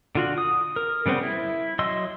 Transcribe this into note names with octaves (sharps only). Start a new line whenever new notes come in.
D3 F4 F#4
D#6
A#4
C#3 G3 B3 C4
E4
F#3 D#5 C6 E6